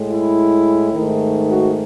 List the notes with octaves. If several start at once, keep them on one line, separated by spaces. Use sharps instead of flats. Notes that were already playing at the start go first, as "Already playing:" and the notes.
Already playing: A2 G#3
E4
G#2 D#3 A3
F#4